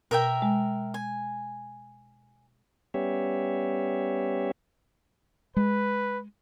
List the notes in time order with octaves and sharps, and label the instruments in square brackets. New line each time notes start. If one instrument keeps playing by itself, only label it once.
[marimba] B2 [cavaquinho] A#4 E5 G5
[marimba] G#3
[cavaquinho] G#5
[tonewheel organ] G3 B3 C#4 G4 C#5 E5
[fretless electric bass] G#3 [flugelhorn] B4